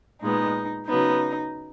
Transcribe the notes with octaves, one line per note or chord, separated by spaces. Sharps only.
A#2 G#3 B3 D#4
C#3 F#3 B3 D#4